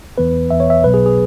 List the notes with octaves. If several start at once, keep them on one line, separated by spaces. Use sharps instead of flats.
E2 E3 B3 B4
E2 E3 B3 E5
C#5
E5
B1 B2 F#3 B3 B4
G#4
G#4